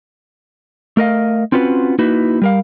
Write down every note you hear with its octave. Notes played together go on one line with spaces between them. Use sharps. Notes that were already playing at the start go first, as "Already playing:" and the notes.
A3 A#4 D#5 F5
C4 C#4 F4 F#4 B4
A#3 D#4 E4 F#4 B4
G3 A#4 F5